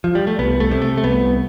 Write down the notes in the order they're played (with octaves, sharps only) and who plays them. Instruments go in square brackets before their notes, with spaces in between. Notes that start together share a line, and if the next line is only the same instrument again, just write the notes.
[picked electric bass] F3
G3
A3
C2 B3
A3
C3
A3
A3
C2 B3